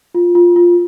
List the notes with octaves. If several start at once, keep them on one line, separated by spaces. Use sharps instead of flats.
F4
F4
F4